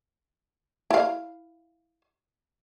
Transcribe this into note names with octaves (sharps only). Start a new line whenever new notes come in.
E4 F5